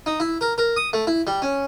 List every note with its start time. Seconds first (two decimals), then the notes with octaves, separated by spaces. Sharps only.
0.06 D#4
0.20 E4
0.41 A#4
0.58 A#4
0.77 D#6
0.93 A3
1.07 E4
1.27 G3
1.42 C#4